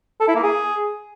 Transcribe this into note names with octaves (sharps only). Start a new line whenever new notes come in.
A4
E4
A#3
G#4